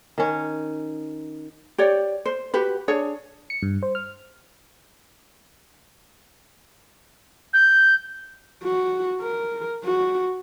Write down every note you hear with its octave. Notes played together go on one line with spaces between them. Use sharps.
D#3 C#4
G4 C#5 D5
C5
F#4 G4 B4
D4 G#4 C#5
C#7
G2
C5
F6
G6
F#4
A#4
F#4